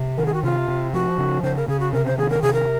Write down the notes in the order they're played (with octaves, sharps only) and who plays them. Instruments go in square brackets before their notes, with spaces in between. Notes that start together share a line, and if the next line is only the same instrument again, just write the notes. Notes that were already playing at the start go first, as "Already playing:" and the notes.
Already playing: [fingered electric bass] C3
[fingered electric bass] D#3 [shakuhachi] A#4
[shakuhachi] G#4
F#4
[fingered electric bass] C3 [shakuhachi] F4
[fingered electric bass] C3
[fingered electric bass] F3 [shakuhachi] F#4
[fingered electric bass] C#3
[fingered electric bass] C#3 [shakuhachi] C5
[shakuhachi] A#4
[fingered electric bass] C#3 [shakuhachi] G#4
[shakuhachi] F#4
[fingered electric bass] C3 [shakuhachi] A#4
[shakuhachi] C5
[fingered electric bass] D#3 [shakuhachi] G#4
[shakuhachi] A#4
[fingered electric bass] C3 [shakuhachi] G#4
[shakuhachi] A#4